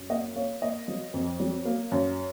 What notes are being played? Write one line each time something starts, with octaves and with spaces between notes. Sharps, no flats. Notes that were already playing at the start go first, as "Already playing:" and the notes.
Already playing: F#2
A#3 D#5 F#5
A#3 C#5 F5
A#3 D#5
F#3
F2
F#3
A#3
F#2